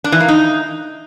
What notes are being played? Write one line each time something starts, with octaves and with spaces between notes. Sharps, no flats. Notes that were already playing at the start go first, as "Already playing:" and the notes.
D4
E3
A#3
D#4